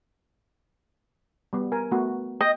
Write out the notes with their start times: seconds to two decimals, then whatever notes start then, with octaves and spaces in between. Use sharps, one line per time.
1.53 G3 B3
1.72 A#4 G#5
1.91 A3 B3 F#4
2.41 D#5 G5